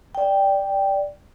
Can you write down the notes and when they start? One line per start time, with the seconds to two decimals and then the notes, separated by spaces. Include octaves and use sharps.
0.15 D5 G5